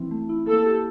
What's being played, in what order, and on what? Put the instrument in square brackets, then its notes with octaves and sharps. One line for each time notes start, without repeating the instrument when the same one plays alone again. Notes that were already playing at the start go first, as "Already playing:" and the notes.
Already playing: [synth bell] E3 C4 E4
A3
E4
[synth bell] A#3 [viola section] A4
[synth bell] G4